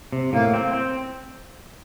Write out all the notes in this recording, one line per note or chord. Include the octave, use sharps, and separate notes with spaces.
C3
A2 A#3
C4
C4